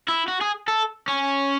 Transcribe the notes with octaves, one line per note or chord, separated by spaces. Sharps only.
E4
F#4
G#4
A4
C#4